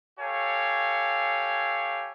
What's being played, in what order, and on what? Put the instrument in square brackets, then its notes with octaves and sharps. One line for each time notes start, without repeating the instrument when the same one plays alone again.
[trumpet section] G4 A4 C#5 F5 G#5